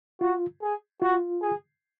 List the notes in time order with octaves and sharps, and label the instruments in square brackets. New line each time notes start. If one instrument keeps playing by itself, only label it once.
[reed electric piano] F4 [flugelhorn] F#4
[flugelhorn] G#4
[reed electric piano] F4 [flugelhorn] F#4
[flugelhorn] G#4